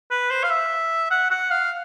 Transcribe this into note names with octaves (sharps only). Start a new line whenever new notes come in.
B4
C5
F5
E5
F#5
F#5
F5